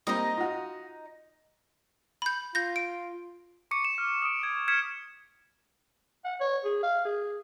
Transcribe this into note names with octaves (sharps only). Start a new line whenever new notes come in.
G3 A#3 C4 D#4 D#5
F4 F#4
B5 G6
F4 G6 A#6
D7
C#6 D6 C#7
E7
F6
D#6 D7
G#6 C#7
F6 G#6 B6 C#7 E7
F#5
C#5
G#4
F5
G#4